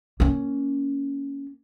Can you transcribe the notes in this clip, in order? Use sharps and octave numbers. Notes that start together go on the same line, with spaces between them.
A#3 C#4